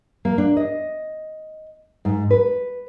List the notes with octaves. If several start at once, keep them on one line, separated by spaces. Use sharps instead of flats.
A#3
D4
D#5
G#2
B4